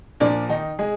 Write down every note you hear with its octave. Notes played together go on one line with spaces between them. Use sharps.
A#2 F3 D4 D5
D#3 D#4
G#3 G#4